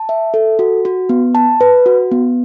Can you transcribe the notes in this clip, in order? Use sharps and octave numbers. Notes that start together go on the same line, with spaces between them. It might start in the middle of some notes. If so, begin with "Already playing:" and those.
Already playing: A5
E5
A4
F#4
F#4
B3
A5
B4
F#4
B3